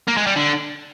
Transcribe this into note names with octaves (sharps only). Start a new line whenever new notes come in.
A#3
G#3
G3
D3